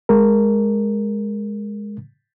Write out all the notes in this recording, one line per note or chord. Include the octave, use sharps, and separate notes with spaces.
G#3 A#4